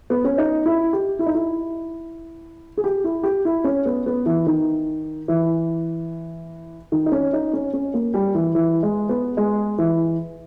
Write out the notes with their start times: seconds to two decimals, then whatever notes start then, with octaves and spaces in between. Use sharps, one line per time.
0.10 B3
0.24 C#4
0.38 D#4
0.66 E4
0.93 G4
1.19 E4
1.26 D#4
1.34 E4
2.77 G#4
2.84 G4
3.04 E4
3.24 G4
3.45 E4
3.64 C#4
3.86 B3
4.06 B3
4.26 E3
4.47 D#3
5.28 E3
6.92 D#3
7.06 D#4
7.12 C#4
7.33 D#4
7.53 C#4
7.73 C#4
7.94 A#3
8.14 G3
8.35 E3
8.55 E3
8.83 G#3
9.09 B3
9.37 G#3
9.78 E3